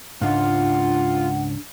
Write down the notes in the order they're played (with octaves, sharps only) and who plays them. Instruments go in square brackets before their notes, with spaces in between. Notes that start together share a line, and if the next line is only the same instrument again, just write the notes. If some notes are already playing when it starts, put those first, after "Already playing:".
[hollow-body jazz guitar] C#2 G#2 [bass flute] D4 [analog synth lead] F4 [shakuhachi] F#5